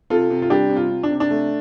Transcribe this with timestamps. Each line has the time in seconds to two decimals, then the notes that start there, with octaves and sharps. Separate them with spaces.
0.10 C3 F4 A4
0.30 C3
0.42 F4
0.50 G3 D4 G4
0.70 C3
0.76 F4
0.90 C3
1.03 D4
1.09 C3
1.20 D4
1.30 A3